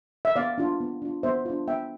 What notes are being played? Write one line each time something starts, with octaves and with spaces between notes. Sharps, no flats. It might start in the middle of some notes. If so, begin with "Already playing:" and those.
E5
B3 D5 F5
D4 F4
B3
D4 F4
B3 C5 E5
D4 F4
B3 E5 G5